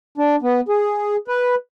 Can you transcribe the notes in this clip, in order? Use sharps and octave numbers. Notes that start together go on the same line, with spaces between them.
D4
B3
G#4
B4